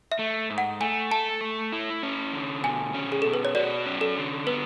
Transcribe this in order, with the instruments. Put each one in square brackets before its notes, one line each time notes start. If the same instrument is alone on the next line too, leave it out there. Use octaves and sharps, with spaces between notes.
[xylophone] E5
[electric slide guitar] A3
G#2
[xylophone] F#5
[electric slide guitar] A3 [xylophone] G#5
[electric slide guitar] A4 [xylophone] A5
[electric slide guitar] A3
E4
C#4
D3
[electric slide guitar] B2 [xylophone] G#5
[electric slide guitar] C#4
[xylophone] G#4
[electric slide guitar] B2 [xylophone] A4
[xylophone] B4
C#5
[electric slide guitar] F#4 [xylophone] D5
[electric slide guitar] C#4
[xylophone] A4
[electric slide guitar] D3
[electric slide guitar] B3 [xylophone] B4